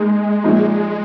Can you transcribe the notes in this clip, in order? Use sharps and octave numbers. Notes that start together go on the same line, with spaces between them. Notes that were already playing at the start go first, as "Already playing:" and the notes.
Already playing: G#2 G#3 A#3 D#4
A#1 A#2 F3 A#3 D#4